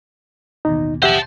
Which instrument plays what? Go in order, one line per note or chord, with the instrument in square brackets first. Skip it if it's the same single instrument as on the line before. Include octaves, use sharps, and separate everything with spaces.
[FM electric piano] A1 D#2 B2 [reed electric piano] D#4
[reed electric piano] G4 E5 F#5 [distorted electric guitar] C5 A5